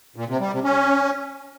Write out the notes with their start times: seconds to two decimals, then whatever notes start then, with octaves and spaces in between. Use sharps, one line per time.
0.16 A#2
0.28 C3
0.40 G3
0.52 C3
0.64 C#4